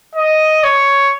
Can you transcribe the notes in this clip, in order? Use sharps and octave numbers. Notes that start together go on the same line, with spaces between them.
D#5
C#5